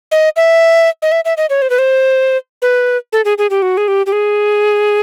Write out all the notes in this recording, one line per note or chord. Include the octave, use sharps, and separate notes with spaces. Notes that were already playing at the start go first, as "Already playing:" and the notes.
D#5
E5
D#5
E5
E5
D#5
C#5
C5
B4
C5
B4
A4
G#4
G#4
G4
F#4
G#4
G4
G4
G#4